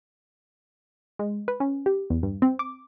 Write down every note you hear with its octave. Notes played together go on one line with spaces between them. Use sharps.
G#3
B4
C#4
G4
E2
G2
C4
D6